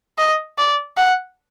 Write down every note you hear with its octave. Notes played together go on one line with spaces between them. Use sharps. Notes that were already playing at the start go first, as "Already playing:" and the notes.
D#5
D5
F#5